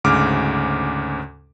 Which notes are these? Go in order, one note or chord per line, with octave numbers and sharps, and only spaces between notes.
D2 G#2 C#3 D6 F6